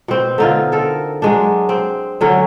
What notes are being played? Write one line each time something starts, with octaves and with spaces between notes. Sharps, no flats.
B2 C4
D3 D#4 F4
A4 A#4
F#3 G#3 D4
C4
D3 F#3 C#4